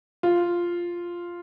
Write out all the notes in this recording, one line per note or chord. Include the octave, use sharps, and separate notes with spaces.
F4